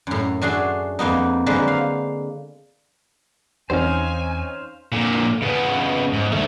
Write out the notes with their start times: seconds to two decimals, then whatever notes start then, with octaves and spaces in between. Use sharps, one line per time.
0.07 F#2 A2
0.41 A3 D4 F#4 G#4 C6
0.99 F2 A#3 B3 D#4
1.46 D3 F#3 G#3 A#3 B4 C5
1.68 F5
3.70 E2 C4 C#4 D#4 C5 F5 G#5
4.92 A#2 D3
5.42 C#3 B3
6.13 G#2
6.32 D2 A3